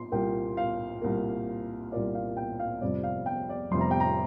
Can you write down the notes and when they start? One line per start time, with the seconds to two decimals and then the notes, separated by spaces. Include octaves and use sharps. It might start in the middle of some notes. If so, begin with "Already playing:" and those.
Already playing: A#2 C6
0.12 C2 A#2 A#3 G5
0.57 F5
1.02 C2 A#2 A#3
1.92 C2 A#2 A#3 D5
2.15 F5
2.37 G5
2.59 F5
2.81 F1 F2 C3 G3 D5
3.04 F5
3.26 G5
3.49 D5
3.71 F1 F2 C3 G3 C6
3.81 A#5
3.91 G5
4.00 A#5